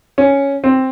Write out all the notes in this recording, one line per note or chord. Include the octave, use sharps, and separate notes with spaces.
C#4
C4